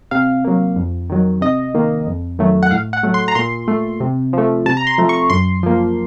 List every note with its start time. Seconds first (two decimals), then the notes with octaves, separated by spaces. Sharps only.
0.11 C3 F5
0.44 F#3 A#3
0.76 F2
1.09 D#3 F#3
1.41 C3 D#5
1.74 D#3 A#3
2.07 F2
2.39 D#3 F#3 A3
2.63 F#5
2.71 A2 F5
2.93 F#5
3.03 F#3 A3
3.14 C6
3.28 A#5
3.35 A#2 C6
3.68 A3
4.00 C3
4.33 F3 A3
4.66 C3 A5
4.77 A#5
4.87 C6
4.98 F3 A3
5.09 C#6
5.30 F#2 C6
5.63 F3 A#3